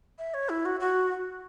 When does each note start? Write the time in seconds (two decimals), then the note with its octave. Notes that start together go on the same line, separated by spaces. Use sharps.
0.19 E5
0.34 C#5
0.49 E4
0.65 F#4
0.80 F#4